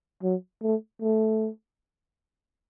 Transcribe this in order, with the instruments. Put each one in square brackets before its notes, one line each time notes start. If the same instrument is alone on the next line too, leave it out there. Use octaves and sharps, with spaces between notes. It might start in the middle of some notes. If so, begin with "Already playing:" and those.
[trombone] F#3
A3
A3